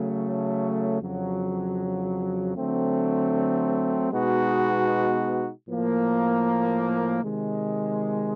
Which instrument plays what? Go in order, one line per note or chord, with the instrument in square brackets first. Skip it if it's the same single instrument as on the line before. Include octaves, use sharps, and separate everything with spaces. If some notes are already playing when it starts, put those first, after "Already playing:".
Already playing: [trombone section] C#3 F#3 A3
F2 C#3 F#3
D3 F#3 A3 C4
B2 G#3 B3 D#4 F#4
A2 F3 A#3
C3 D#3 G#3